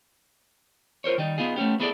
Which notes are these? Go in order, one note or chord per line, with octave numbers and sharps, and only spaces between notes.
F4 A#4 C5 C#5
D#3 G3 D#4
B3 D#4 F4 G#4
A3 B3 C#4 G4
B3 E4 G#4 A4 C5 D5